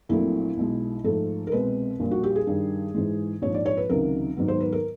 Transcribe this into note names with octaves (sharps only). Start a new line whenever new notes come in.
A#1 A#2 F#3 A3 C4 E4
B1 B2 G#3
G#2 F3 A3 A4
A#4
C2 B2 G#3 C4 B4
A#1 A#2 G3
F#4
G4
G#4
G2 D#3 G3
G#2 E3 G#3
A#1 G#2 F3 C#5
D5
C#5
B4
C#2 C3 D#3 F#3 A#4
G#2 D#3 F#3 B3
C5
B4
A#4